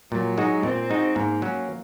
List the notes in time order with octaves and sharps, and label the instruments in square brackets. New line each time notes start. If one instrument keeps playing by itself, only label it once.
[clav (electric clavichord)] A#2 [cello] F#3
[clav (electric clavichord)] G#3 D#4 F#4
[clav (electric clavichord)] A#2 [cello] C4
[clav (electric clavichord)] G#3 D#4 F#4
[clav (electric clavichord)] G#2 [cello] A#3
[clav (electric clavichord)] F#3 C#4